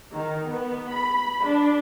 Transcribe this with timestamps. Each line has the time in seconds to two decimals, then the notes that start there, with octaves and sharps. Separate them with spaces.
0.14 D#3
0.48 B3
0.90 B5
1.46 D4